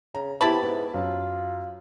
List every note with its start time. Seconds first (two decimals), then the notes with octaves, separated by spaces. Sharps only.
0.15 C#3 A#5
0.41 C3 B3 E4 G4 A5 B5
0.63 G#2 B3
0.94 F#2 F4